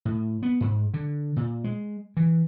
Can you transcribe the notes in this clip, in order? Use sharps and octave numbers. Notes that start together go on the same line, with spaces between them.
A2
B3
G#2
D3
A#2
G#3
E3